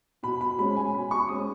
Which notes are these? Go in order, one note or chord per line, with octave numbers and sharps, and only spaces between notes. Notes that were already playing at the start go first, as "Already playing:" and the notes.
B2 B5
B5
G#3 C#4 B5
G#5
B2 B5
C#6
G#3 C#4 D#6